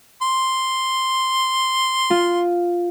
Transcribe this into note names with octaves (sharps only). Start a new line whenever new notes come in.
C6
F4